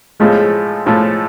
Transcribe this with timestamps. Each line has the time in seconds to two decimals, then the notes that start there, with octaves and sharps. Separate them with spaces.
0.20 A2 F3 G#3 A3
0.86 A2 F3 A3